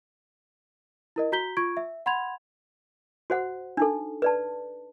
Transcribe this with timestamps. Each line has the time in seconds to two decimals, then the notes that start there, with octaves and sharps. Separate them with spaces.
1.16 E4 A#4 D#5
1.32 F#4 A#5 G6 B6 G7
1.57 F4 C#6 G#6 D7
1.77 E5
2.06 F#5 B5 C6 G#6 F7
3.30 F#4 C5 F#5
3.77 D4 D#4 A4
4.22 B4 D5 A5